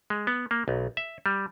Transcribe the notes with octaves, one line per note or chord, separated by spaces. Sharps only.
G#3
B3
A#3
B1
E5
G3